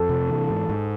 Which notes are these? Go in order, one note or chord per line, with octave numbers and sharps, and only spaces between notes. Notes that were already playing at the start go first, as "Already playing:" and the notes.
Already playing: F2 A4
C3
E3
G#2
G#2